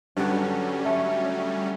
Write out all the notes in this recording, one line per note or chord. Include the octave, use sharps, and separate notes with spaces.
G2 D3 F#3 G3 C#4
A3